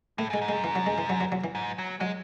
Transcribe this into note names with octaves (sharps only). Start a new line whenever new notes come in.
A2 A3
G#2
G#3
G#2
F#2 G#3
E3
F#3
G#3
E3
F#3
F#3
F#3
E3
G#2
F#3
F#3 G#3